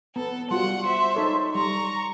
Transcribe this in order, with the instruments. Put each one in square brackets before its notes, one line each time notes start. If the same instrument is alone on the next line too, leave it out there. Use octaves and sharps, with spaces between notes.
[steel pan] B3 [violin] A4
[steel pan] G3 F4 F#4 [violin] F#5 C#7 [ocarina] C6
[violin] C5 E5
[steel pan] D#4 A4 C#5
[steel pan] G3 [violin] A#5 C#6